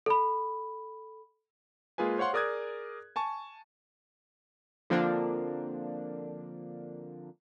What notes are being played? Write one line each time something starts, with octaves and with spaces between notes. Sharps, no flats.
A4 B5
G#3 A#3 F4 G#4 B4 G#5
C5 C#5 F5 F#5 C6
G#4 A#4 D5 D#6 F#6 G#6
G#5 A5 C#6
D3 F3 A#3 C4 D4